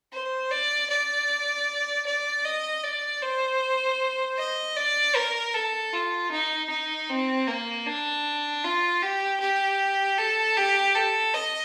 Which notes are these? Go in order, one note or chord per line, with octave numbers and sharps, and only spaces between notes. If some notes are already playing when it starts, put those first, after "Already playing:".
C5
D5
D5
D5
D#5
D5
C5
D#5
D5
A#4
A4
F4
D#4
D#4
C4
A#3
D4
F4
G4
G4
A4
G4
A4
D#5